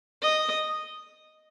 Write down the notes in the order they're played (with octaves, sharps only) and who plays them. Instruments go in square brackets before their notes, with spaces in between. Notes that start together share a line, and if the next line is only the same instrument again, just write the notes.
[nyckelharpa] D#5